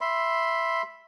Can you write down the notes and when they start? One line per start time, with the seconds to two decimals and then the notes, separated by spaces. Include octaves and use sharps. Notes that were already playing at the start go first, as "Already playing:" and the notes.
0.01 E5 B5 C6